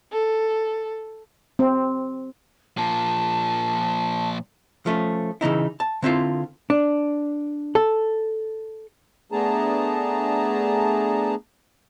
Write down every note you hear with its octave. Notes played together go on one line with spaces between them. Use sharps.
A4
C4
A#2 F3 A5
F3 A3 C#4
C#3 E3 D#4 E4
A5
D3 C4 E4 F4
D4
A4
A3 B3 D4 G#4 A5 A#5